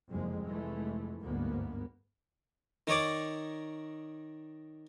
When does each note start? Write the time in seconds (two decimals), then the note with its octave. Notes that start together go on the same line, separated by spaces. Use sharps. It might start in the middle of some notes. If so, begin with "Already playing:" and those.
0.11 F#1 C2 F2 G#3
0.47 F1 E3 G#3 A3
1.22 G1 D2 G#2 A#3 B3
2.87 D#3 D#4 C#5 D5 D6